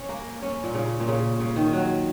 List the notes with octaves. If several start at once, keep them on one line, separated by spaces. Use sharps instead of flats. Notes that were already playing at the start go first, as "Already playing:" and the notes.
Already playing: C#4
A#3
C#4
A#2
C#3
A#2
C#3
C#3
D#3
F#3